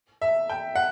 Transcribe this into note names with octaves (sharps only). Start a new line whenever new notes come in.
E5
G5
F#5